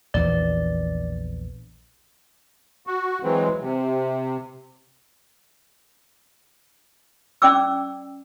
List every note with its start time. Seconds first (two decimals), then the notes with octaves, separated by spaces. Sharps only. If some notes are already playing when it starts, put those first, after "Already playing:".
0.14 A#1 E2 E3 D5
2.87 F#4
3.23 E3 F#3 G#3 C4
3.61 C3
7.42 C#4 D5 G5 D6 E6